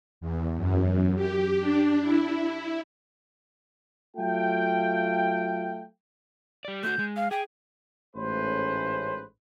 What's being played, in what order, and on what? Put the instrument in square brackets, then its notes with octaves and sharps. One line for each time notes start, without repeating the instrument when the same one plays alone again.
[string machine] E2
F#2
G4
D4
E4
[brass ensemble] F#3 A3 F4 F5 G5
[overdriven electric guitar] G3 D5
[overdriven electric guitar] A3 F#4 [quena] G6
[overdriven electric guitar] G#3
[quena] F5
[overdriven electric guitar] G#4 [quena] G5
[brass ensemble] A1 G#2 A3 C#4 B4 C5